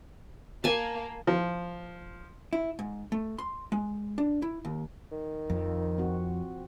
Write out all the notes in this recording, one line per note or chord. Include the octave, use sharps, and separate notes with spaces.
A#3 G#5 A5
F3
E4
G#2
A3
C6
G#3
D4
E4
D#2
D#3
F2 F3
C4 F#4